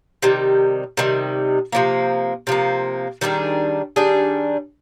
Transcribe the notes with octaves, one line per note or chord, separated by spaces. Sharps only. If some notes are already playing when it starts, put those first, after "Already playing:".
C3 D#3 G3
C3 D#3 G3
C3 F3 A#3
C3 F3 A#3
D#3 G3 D4 G#4
D#3 G3 D4 G#4